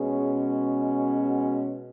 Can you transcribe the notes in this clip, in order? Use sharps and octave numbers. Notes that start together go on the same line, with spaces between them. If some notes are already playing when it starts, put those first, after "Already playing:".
Already playing: B2 G#3 C#4 G#4
F#4